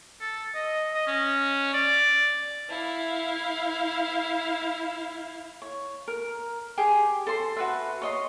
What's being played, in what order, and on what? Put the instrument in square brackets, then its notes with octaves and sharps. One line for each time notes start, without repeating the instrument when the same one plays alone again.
[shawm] A4
D#5
D#5
C#4
D5
[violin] E4 F5
[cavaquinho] C#5
A#4
G4 G#4 G5 G#5
A4 C5 C6
F#4 B4 E5
C#5 D#5 C6